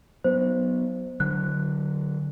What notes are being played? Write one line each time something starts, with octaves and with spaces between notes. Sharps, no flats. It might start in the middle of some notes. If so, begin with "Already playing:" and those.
F#3 B3 C5
D3 F#3 F#6